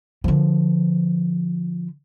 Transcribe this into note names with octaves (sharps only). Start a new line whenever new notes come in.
D3 F3